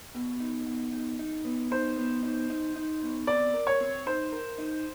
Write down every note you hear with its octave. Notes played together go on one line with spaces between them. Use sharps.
B2
D#4
B2
D#4
D#4
B3
D#4 C5
B3
D#4
D#4
D#4
B2
C4 D5
A#4
C#5
C4
D#4 C5
A#4
D#4